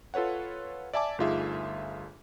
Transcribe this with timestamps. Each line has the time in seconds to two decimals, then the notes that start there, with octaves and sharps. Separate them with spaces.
0.14 F4 A4 B4 C#5 F#5
0.93 D5 E5 G#5 A5 D6
1.18 G1 A3 D#4 F4 G#4 E5